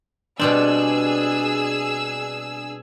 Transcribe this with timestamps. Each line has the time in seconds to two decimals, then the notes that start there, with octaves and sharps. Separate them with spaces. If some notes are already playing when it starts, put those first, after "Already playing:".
0.40 B2 G3 C4 D4 G#4 G#5 E6